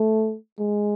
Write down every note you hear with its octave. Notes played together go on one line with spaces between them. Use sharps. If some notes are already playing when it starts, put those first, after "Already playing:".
Already playing: A3
G#3